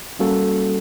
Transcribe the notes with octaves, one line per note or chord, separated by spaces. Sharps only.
G3 A#3 C#4 F#4 A4